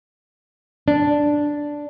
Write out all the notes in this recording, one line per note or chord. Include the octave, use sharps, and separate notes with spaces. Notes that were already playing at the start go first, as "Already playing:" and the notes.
D4